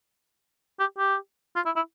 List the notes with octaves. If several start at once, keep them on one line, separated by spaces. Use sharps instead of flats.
G4
G4
F4
E4
E4